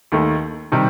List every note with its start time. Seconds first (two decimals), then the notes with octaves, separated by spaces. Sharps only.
0.12 D#2 D#3 A3
0.72 C3 D#3 G3